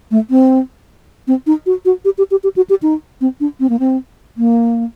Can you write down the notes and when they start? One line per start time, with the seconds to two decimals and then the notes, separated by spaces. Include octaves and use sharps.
0.11 A3
0.30 C4
1.27 C4
1.47 D#4
1.66 F#4
1.85 F#4
2.05 G4
2.18 G4
2.31 G4
2.44 G4
2.56 F#4
2.70 G4
2.82 D#4
3.21 C4
3.40 D4
3.60 C4
3.69 A#3
3.79 C4
4.37 A#3